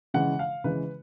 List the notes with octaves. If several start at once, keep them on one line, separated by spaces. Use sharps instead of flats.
C#3 E3 G#3 F#5
F5
C#3 E3 G#3 B4